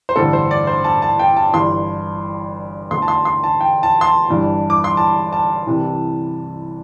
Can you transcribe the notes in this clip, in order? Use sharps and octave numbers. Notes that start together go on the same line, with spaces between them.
C5
A1 G2 D3 A4
C5
D5
C5
A5
A5
G5
A5
G1 G2 E3 C6
D2 D3 C6
A5
C6
C6
A5
G5
A5
C6
A5
G1 G2 E3
D6
C6
A5
A5
C2 C3 E3